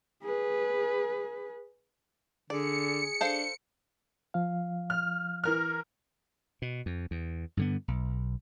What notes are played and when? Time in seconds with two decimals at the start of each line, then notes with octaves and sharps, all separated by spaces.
0.23 G#4 B4
2.50 D3 G#4 D5 C#7
3.21 D4 A4 C5 F5
4.34 F3 F5
4.90 F6
5.44 E3 A#4 F6
6.62 B2
6.86 F2
7.11 E2
7.57 G2 D3 B3
7.88 B1